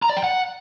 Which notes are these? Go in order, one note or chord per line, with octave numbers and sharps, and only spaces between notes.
A#5
D5
G5
F#5